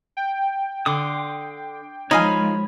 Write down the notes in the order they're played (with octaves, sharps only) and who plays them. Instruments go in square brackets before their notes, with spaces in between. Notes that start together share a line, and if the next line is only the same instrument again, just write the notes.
[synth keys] G5
[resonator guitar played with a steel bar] D3 [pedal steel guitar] C6 D6 D#6
[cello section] D#3 F3 G#3 [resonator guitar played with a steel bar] D#4 F4 G#5 [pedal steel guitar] C#5 B5